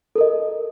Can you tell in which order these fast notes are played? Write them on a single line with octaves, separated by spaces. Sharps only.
A4 A#4 D#5